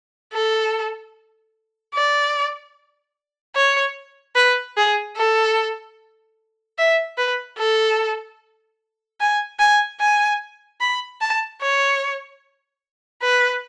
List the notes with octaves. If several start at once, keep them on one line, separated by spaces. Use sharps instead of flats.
A4
D5
C#5
B4
G#4
A4
E5
B4
A4
G#5
G#5
G#5
B5
A5
C#5
B4